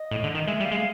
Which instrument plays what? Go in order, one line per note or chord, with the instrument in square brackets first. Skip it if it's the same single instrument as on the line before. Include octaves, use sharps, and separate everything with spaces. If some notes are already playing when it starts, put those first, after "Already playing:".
Already playing: [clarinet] D#5
[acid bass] A2
D3
D#3
[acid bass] G#3 [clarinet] E5
[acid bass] G3
[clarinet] F5
[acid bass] G#3